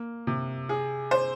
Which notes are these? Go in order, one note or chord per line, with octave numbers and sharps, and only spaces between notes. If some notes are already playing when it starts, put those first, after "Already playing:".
Already playing: A#3
C3
G#4
C5